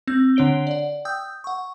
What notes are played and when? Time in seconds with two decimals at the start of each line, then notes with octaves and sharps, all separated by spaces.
0.07 C4 G6
0.36 D3 D4 C#5 D7 G7
0.67 D5 F#5
1.05 G5 D#6 E6 G6
1.44 F#5 C#6